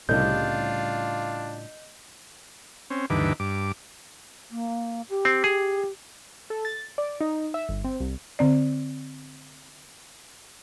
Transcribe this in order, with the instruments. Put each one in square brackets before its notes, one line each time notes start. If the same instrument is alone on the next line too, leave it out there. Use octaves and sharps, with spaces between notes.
[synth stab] C2 [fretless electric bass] A2 C#3 G3 [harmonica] D4 F4 [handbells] D#5 G6
[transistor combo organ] C4 C#4
D2 G2 D#3 E3 B4 D6
G2 D6
[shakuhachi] A#3
G4
[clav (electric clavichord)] C4
G#4
[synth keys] A4
A6
D5
D#4
E5
G1
C4
C2
[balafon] D3 C4 D5